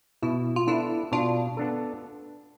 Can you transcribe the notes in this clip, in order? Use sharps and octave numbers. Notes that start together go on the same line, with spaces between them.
B2 E4
F4
B3 D4 E4 A4
B2 D4 F4
B3 D4 A4